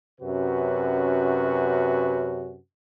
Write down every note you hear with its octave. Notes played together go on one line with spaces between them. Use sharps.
F#2 C3 C#4 F#4 B4